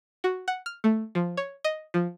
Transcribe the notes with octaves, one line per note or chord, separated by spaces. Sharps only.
F#4
F#5
F6
A3
F3
C#5
D#5
F3